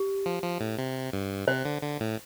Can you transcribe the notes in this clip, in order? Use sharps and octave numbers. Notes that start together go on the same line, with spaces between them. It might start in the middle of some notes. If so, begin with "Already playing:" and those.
Already playing: G4
F3
F3
A2
C3
G2
C3 C5
D3
D3
A2